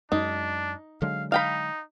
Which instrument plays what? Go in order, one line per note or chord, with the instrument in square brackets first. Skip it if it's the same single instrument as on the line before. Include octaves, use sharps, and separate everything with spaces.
[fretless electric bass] F#2 G#3 [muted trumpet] D4 [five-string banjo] D#4
[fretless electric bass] D3 F#3 G#3 [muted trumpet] F5
[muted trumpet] D#4 [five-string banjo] F5 G5 B5